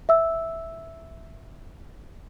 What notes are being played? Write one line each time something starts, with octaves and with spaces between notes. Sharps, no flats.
E5 E6